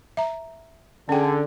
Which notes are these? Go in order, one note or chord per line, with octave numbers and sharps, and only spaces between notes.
E5 A#5
D3 C#4 G#4 G5